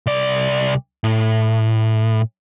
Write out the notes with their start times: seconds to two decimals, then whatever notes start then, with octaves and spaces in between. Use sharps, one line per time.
0.06 C2 D5
1.04 A2